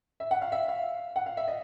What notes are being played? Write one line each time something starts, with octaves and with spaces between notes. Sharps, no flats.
E5
F#5
F5
E5
F5
F#5
F5
E5
D#5